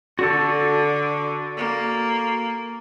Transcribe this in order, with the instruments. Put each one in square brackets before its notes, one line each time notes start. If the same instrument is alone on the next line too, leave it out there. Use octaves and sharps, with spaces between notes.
[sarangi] D3 [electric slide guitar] F#4 A4
[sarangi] A#3